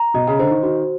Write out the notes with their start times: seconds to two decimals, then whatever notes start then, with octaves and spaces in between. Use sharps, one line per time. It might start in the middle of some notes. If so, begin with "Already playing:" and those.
Already playing: A#5
0.14 B2 D#5
0.27 C#3
0.39 D3 C5
0.51 D#3
0.63 D#3 F#4